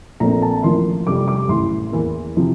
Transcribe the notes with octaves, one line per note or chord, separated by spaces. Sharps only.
A#1 A#2 A3 C4 A#5
A5
A1 A2 F3 A#3 C6
F1 F2 C3 G3 D6
D6
A1 A2 E3 C6
E2 E3 A#3
C3 F3 C4